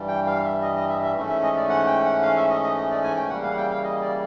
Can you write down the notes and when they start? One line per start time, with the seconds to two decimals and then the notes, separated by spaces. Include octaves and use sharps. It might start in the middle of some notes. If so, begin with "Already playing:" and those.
Already playing: G2 E3 G3
0.08 G5
0.26 F5
0.44 E5
0.62 D#5
0.76 D#5
0.89 E5
1.02 E5
1.16 G#2 E3 A3 C#4
1.29 E5
1.43 D#5
1.56 D5
1.69 F#5
1.87 G5
2.05 F#5
2.23 F5
2.37 E5
2.50 D#5
2.63 D#5
2.77 D#5
2.90 D5
3.03 G#5
3.16 G5
3.30 C#3 E3 G3 A#3 F#5
3.43 F5
3.51 F#5
3.57 G5
3.70 F5
3.84 D#5
4.01 D5